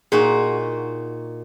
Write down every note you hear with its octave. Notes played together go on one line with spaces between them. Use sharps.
A#2 D#4 F#4 G#4